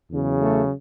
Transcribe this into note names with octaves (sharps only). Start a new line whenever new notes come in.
E2 C#3 F#3
A3